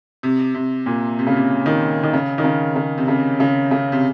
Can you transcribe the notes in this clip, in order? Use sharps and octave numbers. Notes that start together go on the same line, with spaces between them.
C3
C3
A#2
C3
C#3
C3
D#3
D#3
C#3
D#3
C#3
C#3
C3
C#3
C#3
C#3
C3